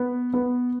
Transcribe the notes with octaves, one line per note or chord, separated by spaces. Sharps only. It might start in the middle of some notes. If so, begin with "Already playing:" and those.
Already playing: B3
B3